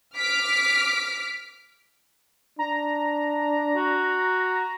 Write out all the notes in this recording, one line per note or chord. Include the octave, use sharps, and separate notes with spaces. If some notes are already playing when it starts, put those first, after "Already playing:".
D6 F6 B6 D7
D4 A#5
F#4